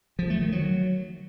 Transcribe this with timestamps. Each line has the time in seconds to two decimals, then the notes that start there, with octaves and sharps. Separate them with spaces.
0.19 F3
0.30 A3
0.41 D#3
0.52 F#3